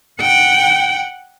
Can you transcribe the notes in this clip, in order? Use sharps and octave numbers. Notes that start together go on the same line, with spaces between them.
F#5 G5